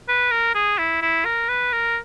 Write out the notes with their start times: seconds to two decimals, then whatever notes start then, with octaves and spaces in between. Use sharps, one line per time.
0.08 B4
0.31 A#4
0.55 G#4
0.78 E4
1.02 E4
1.25 A#4
1.49 B4
1.73 A#4